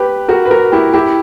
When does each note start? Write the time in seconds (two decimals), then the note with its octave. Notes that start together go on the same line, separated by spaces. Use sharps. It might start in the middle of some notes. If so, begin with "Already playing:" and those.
Already playing: G4 B4
0.28 F#4 A#4
0.45 B4
0.51 F#4 A#4
0.72 E4 G4
0.93 E4 G4